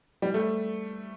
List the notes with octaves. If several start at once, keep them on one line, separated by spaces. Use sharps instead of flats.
G3
A3